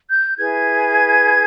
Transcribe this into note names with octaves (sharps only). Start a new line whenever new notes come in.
G6
E4 G#4 B4 G#6